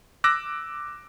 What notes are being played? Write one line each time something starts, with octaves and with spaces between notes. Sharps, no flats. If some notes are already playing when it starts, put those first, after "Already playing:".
D6 E6 F#6 A#6